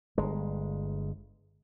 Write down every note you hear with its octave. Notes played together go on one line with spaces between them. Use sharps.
G1 G#3